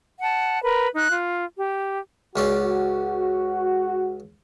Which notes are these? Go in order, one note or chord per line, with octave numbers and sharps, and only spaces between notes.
F#5 A5
A#4 B4 B5
D#4 F#6
F4
G4
C#2 C#4 F#4 D5